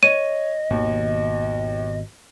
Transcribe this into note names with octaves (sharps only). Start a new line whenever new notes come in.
C#5 D#5 D#7
G#1 D#2 B2